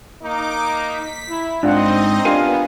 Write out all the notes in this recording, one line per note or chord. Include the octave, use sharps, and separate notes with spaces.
A#3 D#4 D6
B6
E4
G#2 C4 D4 D#4 F4 D#5 F#5
B3 D4 F4 G4 A#4 F5 G#5